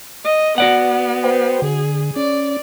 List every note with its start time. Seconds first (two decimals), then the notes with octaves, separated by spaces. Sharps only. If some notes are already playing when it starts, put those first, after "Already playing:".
0.25 D#5
0.58 B3 F#4 D5 F#5
1.24 B4 C5 G5
1.62 D3 G#4
2.16 C#4 D5